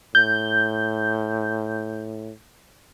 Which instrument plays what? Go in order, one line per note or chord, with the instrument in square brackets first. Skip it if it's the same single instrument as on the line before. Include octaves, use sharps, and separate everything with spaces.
[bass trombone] A2 [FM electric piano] G6